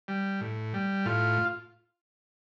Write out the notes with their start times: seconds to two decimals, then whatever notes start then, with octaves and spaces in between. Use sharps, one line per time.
0.08 G3
0.41 A2
0.74 G3
1.06 A2 F4